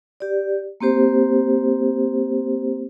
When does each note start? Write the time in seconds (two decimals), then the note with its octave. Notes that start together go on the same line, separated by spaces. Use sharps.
0.20 G4 D5
0.81 A#3 C4 G4 C5